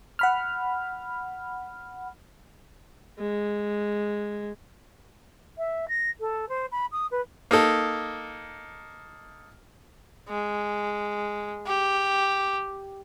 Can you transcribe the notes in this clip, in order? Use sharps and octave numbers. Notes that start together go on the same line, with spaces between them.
F#5 B5 F6
G#3
E5
A#6
A4
C5
B5
D#6
B4
A#3 D#4 A4
G#3
G4